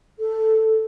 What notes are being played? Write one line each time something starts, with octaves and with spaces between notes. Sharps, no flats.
A4